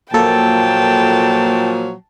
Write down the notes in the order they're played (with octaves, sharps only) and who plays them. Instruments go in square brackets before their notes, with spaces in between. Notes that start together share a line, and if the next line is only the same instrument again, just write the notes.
[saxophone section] A#2 F3 F#3 [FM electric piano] A#3 A4 [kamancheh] G5 A5